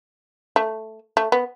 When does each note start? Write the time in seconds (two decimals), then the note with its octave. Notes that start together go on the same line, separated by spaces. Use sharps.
0.56 A3
1.17 A3
1.32 B3